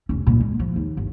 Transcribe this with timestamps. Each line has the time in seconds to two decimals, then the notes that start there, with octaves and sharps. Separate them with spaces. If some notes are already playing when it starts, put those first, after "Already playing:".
0.09 F1 C#4
0.27 G2 A#2
0.40 G#3
0.60 F3
0.76 D#2
0.97 G1